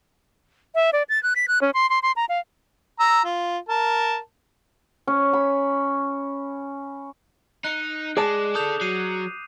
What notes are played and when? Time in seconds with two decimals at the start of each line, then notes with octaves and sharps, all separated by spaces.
0.75 E5
0.93 D5
1.09 A6
1.23 F#6
1.36 B6
1.48 F#6
1.62 C#4
1.74 C6
1.90 C6
2.03 C6
2.16 A#5
2.29 F5
3.00 A#5 E6
3.25 F4
3.69 A#4 A5
5.07 C#4
5.33 B5
7.64 D#4 F#6 C#7
8.17 G#3 G#4 D5 A5 D6 E7
8.55 D4 A4 D#6 G6 F7
8.81 F#3 C7 D#7